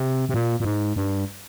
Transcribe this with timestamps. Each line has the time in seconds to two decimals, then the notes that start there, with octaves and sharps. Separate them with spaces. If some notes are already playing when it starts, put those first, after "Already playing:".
Already playing: C3
0.29 C3
0.34 A#2
0.60 A#2
0.65 G#2
0.96 G2